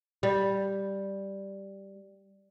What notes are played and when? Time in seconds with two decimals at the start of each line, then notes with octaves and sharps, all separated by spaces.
0.23 G3